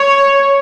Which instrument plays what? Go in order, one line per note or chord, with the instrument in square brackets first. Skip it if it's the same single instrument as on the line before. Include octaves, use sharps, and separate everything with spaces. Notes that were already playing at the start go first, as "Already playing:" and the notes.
Already playing: [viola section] C#5